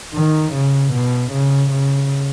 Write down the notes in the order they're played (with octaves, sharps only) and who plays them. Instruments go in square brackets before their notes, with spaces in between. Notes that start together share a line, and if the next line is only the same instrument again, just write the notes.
[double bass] D#3
C#3
B2
C#3
C#3